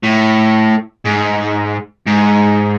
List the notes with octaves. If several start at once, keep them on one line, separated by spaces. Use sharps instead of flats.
A2
G#2
G#2